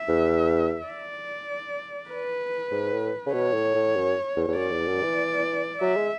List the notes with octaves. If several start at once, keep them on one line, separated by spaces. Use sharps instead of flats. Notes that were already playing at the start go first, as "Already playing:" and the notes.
Already playing: E5
E2
D5
B4
G#2
A2
C#3
B2 C#5
A2
A2
F#2
E2
E2
F#2 D5
E2
F#2
E3
F#3 E5
G#3